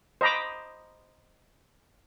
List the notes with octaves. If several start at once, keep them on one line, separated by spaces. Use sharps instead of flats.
C5 D#5 A#5 B5 D6